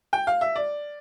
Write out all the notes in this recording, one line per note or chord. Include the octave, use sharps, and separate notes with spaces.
G5
F5
E5
D5